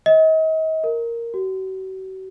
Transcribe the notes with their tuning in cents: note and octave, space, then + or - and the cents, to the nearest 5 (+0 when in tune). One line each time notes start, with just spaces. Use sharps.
D#5 +40
A#4 -5
F#4 +40